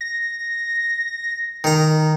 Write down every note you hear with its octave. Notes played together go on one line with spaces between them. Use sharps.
A#6
D#3 A#5